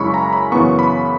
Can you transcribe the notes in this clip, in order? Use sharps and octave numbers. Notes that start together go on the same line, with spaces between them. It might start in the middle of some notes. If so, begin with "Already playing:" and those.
Already playing: F#2 C#3 G#3 C#4 E4 B5 C#6
A#5
B5
F#2 C#3 E3 B3 C#6
B5